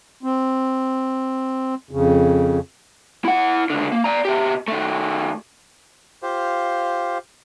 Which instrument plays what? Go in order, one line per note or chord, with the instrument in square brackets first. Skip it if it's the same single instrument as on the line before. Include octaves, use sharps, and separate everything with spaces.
[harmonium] C4
F2 C#3
[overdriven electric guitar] E4 F#5
C#2 D3
A#3
D5 A#5
B2 G4
D#3 A3
[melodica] F4 G4 C5 F5